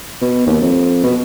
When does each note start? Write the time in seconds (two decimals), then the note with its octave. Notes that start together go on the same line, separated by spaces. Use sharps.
0.22 B2
0.46 D#2
0.62 F2
1.04 B2